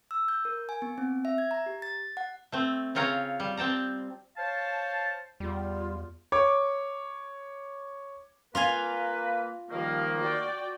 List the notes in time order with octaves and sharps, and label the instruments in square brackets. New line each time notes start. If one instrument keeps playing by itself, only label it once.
[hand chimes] E6
G6
A#4
G#5
B3
C4
E5
G#6
A#5
G4
A6
F#5
[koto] A3 C4
C#3 C4 F4 C#5 A#5
G3
C4 G5 A5 A#5
[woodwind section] C5 C#5 F5 A5
[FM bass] E2 [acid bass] G3 [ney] F4
[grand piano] C#5 D6
[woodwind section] A#3 B4 [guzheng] F4 F5 G#5
[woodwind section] D#3 A#3 [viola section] F3 G3
[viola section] F#4 D5 G5